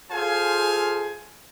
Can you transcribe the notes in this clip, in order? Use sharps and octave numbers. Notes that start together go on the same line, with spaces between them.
F4 G#4 A4 C5 F5 G#5